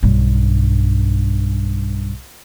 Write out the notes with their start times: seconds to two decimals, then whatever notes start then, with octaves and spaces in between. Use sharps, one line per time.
0.03 B1 G2